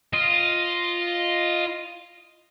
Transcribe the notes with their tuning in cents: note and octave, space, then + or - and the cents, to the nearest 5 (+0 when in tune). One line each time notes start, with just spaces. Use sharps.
F4 +0 D#5 +0